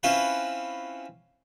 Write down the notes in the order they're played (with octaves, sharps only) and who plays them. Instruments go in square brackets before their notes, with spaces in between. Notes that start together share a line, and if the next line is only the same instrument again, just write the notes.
[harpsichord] C4 C#4 E4 F4 B4